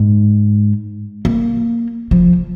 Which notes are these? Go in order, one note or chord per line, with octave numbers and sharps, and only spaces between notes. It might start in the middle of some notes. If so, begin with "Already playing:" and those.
Already playing: G#2
A#3
F3